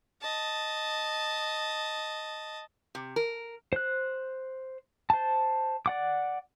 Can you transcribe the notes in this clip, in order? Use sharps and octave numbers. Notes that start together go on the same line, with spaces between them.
D#5 A5
C3
A#4
C5 F#6
C5 A5
D5 F#5 D6